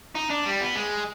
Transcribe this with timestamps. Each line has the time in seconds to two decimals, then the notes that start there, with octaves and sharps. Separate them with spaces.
0.15 D#4
0.30 D4
0.46 G3
0.61 B3
0.75 G#3